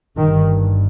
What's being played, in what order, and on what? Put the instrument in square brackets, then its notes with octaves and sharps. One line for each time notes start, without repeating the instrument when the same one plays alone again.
[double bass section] G1 G2 D#3